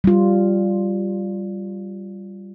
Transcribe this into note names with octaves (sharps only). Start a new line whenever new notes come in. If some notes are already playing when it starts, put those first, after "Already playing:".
G3 F4